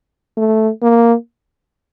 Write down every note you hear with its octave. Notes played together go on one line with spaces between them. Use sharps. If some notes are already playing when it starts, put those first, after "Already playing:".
A3
A#3